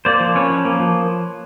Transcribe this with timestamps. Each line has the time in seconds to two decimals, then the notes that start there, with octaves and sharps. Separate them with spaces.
0.05 A#3 C5 D5
0.20 F3
0.35 C#4 B4 C#5
0.50 F3
0.65 A#3
0.80 F3